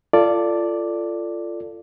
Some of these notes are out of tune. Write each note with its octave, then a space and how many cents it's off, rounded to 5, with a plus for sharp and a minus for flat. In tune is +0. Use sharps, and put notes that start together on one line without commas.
F4 -25 A4 +15 D5 +0